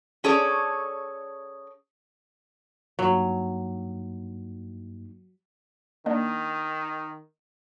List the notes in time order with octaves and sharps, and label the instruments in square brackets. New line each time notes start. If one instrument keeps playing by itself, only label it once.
[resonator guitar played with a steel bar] C#4 G#4 A4 C#5 D5
[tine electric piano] G2 A#3 D#4 [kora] F#3
[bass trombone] D#3 [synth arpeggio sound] A#3 D4 D#5